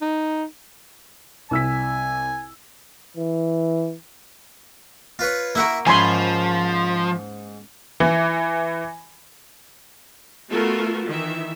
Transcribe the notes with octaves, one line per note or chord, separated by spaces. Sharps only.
D#4
C2 G#5 E6 B6
E3
F4 B4 C#5
A#3 E4 F#4 A#4 E5
G#2 F3 C#4 E4 G#5 B5 C6
E3
A3 B3 F4 F#4 A4 A#4
D#3 E3 E5